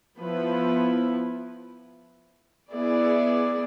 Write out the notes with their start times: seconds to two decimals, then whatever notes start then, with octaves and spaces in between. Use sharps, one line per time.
0.19 F3 B3 E4 B4
2.73 B3 E4 G#4 D5